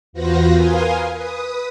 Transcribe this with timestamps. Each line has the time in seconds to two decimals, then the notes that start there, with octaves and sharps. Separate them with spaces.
0.13 E2 F4 F#4 B4 C5 A#6
0.53 A#4 B4 F5 G#5 C6 D#6
1.13 B4 D#6